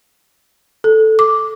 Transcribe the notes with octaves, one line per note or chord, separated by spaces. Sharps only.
A4
D6